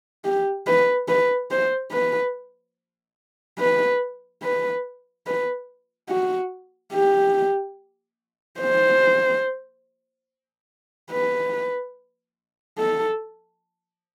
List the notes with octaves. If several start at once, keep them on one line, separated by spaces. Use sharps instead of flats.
G4
B4
B4
C5
B4
B4
B4
B4
F#4
G4
C5
B4
A4